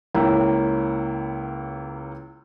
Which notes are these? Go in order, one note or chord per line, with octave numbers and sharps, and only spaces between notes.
C#2 A#3 C#4 E4 G5 B5